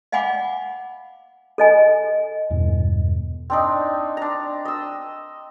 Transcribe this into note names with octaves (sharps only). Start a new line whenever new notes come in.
D#5 F5 F#5 G#5 B5 D6
A4 D#5 G#5
E2 G2 B2
C4 D4 D#4
D4 A#5
D#5 E6